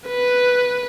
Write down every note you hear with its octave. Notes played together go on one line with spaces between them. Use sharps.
B4